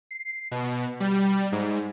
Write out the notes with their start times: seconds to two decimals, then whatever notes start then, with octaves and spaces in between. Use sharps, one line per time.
0.11 C7
0.51 B2
1.00 G3
1.52 G#2